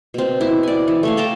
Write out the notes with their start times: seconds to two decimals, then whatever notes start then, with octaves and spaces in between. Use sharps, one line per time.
0.14 B2 C4
0.41 E4
0.63 D5 G#5
0.88 E3
1.03 A3 C#5 F5
1.17 G5 A5 A#5 C6